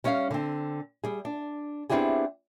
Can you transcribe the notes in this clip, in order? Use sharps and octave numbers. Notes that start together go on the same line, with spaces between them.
G3 C#4 C#5 E5 F5
D3 C4
G3 G#4
D4
B3 C4 D4 E4 G4 G#4